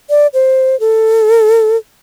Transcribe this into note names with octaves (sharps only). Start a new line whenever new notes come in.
D5
C5
A4